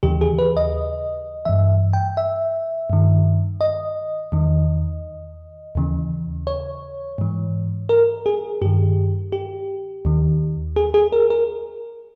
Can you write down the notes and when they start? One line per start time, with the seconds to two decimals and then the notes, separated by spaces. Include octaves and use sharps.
0.03 D#2 C#3 E3 G4
0.21 G#4
0.39 B4
0.57 D#5
1.45 G2 E3 E5
1.93 G5
2.17 E5
2.90 G2 D#3
3.61 D#5
4.32 E2 D#3
5.75 D#2 C#3 E3
6.47 C#5
7.18 G#2 E3
7.89 A#4
8.26 G#4
8.62 G2 D#3 G4
9.32 G4
10.05 D#2 D#3
10.76 G#4
10.94 G#4
11.13 A#4
11.30 A#4